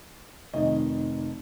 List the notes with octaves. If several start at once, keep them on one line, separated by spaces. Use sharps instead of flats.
F1 F2 D#3 D#5